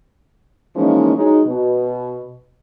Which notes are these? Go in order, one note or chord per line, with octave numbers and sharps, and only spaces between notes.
E3 F3 G#3 A#3 C#4 D#4
F#3 G#3 D#4
B2